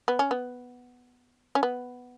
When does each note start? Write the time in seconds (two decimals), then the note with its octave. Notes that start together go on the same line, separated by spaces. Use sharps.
0.08 B3
0.19 C#4
0.31 B3
1.55 C#4
1.63 B3